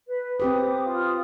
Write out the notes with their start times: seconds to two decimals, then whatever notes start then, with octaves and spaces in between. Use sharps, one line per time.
0.07 B4
0.40 C4 G4 B4 D6 D#6
0.85 F4 D#6